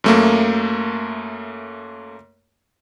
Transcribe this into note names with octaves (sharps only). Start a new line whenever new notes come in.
F#2 A3 A#3